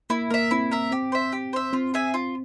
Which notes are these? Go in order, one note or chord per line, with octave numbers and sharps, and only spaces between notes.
A#3 E4
A#3 A#4 E5
C4 E4
A#4 E5
C4 G4
C5 E5
G4
C5 E5
C4 F4
G#4 E5 G#5
F4